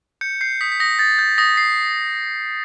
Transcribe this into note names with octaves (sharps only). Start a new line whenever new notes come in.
G6 C#7
G6 C7
D#6 B6
B6
D#6 A#6
G6 A6
G6
D#6 A#6
C7